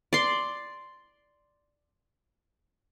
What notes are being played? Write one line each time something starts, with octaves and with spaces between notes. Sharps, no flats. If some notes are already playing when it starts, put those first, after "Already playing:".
D5 C6